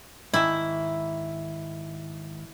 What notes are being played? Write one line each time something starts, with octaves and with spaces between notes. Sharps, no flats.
G#2 D#3 E4 E5